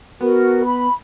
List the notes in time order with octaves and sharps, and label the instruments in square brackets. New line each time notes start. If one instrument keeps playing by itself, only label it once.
[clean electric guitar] B3 [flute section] F#4 A#4
[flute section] B5